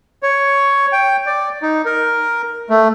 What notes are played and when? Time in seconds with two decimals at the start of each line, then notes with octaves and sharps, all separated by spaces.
0.23 C#5
0.92 G5
1.26 D5
1.62 D#4
1.85 A#4
2.70 A3